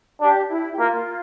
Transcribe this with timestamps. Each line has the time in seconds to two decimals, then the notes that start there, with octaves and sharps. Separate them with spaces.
0.21 D4 G4
0.50 E4
0.73 G4
0.79 A#3 F4